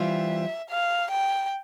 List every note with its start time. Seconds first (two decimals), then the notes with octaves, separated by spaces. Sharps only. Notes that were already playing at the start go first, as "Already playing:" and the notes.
Already playing: E3 G3 C4 F4 E5
0.70 F5
1.11 G5